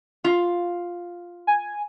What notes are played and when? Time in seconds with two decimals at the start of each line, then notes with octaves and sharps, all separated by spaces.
0.24 F4 F5
1.47 G#5